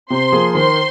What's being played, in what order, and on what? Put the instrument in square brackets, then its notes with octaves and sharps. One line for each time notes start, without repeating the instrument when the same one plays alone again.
[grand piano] C3 [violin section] C5 C6
[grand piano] F3 A#3 F4 G#4
[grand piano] D#3 [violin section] C5 C6